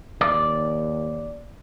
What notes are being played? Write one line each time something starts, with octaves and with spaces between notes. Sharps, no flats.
D#2 D5